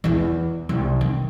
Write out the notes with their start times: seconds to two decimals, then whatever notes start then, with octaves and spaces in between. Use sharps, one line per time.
0.04 E2 E3
0.69 C2
1.01 D#3